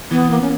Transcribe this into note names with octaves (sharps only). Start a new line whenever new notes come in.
E3 B3
A#3
C#4